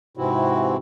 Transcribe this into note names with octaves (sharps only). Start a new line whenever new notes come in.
G#2 C3 E3 C4 E4 F#4